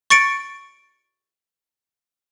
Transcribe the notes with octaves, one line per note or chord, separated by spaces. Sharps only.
C#6 A6 C#7 D7